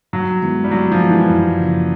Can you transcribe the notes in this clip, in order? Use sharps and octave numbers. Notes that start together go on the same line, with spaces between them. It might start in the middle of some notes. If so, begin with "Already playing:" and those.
G2 F#3
D#3 G#3 B3 E4
G3
G2 F#3
F3
D#3 G#3 B3 E4
E3
F#2
C#3 F3 A#3 C#4